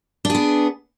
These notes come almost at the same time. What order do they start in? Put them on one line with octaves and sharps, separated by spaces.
D4 G#4 B3